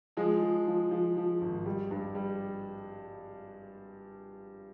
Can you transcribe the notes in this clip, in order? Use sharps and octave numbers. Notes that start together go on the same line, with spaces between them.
F3 G#3 G#4
F3
F3
F3
F3
G#1
G3
G2
G3